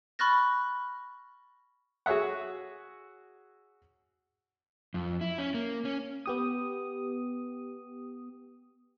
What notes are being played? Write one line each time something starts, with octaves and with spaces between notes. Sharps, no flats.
B5 C#6 F6 F#6 A6 A#6
F#4 G#4 C#5 E5 F#5
F2
E4
C#4
A#3
C#4
B3 G4 D#6